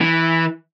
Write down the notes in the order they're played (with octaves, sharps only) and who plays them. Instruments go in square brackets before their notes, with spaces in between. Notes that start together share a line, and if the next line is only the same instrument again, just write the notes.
[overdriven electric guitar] E3